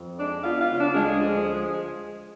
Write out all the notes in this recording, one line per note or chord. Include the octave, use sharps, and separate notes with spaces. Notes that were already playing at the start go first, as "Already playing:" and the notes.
Already playing: F2
G#3 D4 D5
B3 F4 F5
F4 F5
C#3
D4 D5
D2 G#3 G#4
F3
G#3